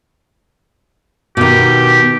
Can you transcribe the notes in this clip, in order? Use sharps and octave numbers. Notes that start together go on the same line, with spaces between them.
B2 D#3 G4